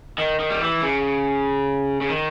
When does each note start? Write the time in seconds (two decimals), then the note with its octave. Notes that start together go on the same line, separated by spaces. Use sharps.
0.18 D#3
0.39 D#3
0.50 G3
0.61 E3
0.82 C#3
2.01 C#3
2.09 D#3